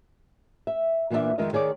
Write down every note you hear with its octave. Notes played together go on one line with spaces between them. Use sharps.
E5
A#2 E3 A#3 B3 D4 E5
F2 D#3 G#3 A#4 D#5 E5
D#3 G#4 C#5 D5